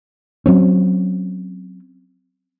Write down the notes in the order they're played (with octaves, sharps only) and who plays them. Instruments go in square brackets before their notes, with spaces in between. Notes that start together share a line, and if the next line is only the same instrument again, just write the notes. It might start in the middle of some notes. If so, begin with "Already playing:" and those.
[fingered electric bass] F#3 C4 C#4